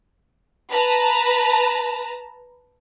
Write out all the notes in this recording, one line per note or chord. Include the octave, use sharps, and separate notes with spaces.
B4 A5 A#5